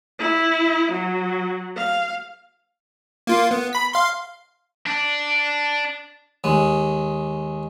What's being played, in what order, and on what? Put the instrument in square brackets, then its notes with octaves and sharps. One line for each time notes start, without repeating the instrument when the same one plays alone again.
[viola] E4
F#3
F5
[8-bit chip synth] A#3 F4
B3
B5 B6
F5 C6
[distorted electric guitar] D4
[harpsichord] D#2 G#3